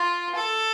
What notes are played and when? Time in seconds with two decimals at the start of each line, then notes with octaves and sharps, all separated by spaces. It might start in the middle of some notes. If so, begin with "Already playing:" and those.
Already playing: F4
0.35 A4